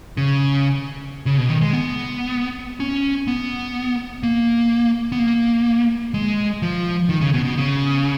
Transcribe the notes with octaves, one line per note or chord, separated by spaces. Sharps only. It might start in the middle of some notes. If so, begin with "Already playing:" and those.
C#3
C#3
B2
D#3
G#3
B3
C#4
B3
A#3
B3
A#3
G#3
F3
D#3
C#3
B2
B2
C#3